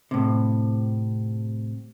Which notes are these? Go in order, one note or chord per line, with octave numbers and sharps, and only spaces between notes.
A2 C3